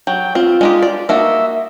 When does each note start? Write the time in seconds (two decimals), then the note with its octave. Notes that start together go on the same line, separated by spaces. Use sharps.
0.07 F#3 G5
0.35 C4 F4
0.61 G#3 D#4 G4
0.82 D5
1.09 A#3 D#4 F#4 E5